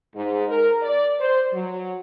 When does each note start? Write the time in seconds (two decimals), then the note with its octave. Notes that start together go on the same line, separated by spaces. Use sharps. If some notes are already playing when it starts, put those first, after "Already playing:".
0.15 G#2
0.48 A#4
0.81 D5
1.20 C5
1.53 F#3